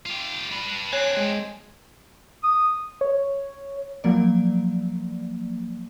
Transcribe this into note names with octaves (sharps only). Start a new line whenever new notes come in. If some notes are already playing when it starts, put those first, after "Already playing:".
F4 G4
D4 B4
C4 D4 C#5 G#5 F#6
G#3
D#6
C#5
F3 F#3 A#3 D5